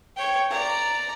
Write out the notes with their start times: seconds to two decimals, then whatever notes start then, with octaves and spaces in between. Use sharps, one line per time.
0.16 C#5 G5
0.50 D5 A#5